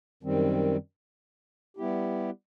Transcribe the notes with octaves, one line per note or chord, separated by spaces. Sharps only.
F#2 D#3 G3 C4
G3 B3 E4 G4